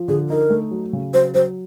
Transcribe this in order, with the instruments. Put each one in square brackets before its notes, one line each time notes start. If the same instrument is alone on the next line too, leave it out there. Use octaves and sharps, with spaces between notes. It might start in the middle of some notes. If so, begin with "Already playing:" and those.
Already playing: [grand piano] F3
[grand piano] D3 [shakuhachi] G#4
[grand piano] D#4 [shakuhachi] A#4
[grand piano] A3
F#3
C#3
[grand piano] F#3 [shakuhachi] C5
[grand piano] F#3 [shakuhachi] C5